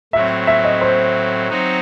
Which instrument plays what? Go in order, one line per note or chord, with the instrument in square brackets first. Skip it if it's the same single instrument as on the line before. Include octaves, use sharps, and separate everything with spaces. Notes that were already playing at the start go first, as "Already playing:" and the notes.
[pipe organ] A2 F#3 C4 [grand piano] E5
[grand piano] E5
D#5
C5
[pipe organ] F#3 C4 D#4 F#4